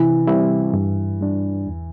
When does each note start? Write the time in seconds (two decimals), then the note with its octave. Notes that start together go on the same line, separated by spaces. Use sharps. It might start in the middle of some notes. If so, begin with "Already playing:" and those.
Already playing: C3 E3
0.27 G3 C4 E4
0.74 G2
1.21 G3 D4
1.67 E2